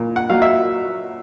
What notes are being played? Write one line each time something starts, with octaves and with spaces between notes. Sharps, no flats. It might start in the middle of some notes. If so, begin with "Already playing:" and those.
Already playing: A#2
F#5
F#3 A#3 F5
E5